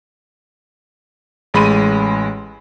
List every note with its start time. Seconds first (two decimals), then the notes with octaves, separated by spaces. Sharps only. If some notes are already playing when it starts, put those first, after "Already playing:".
1.54 A1 G#3 B5 C6 D#7